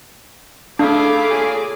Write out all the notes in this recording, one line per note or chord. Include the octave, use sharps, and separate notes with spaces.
A3 D4 E4 G#4 F5 D6
A#2 C#3 G#4